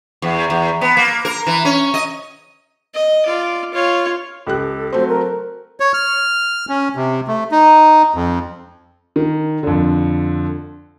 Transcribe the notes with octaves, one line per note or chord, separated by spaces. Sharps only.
E2
E2
B3
A#3
A#4
E3
C#4
D#5
D#5
F4 D5
F4 C#5
C#2 G4 A4 F#6
F#3 A3 C4 C5
A#4
C#5
F6
C#4
C3
A3
D#4
F2
D#3
F2 D3